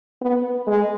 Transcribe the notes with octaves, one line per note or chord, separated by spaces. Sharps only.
B3
G#3